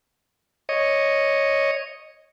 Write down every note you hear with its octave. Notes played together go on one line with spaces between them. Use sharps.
C#5 D#5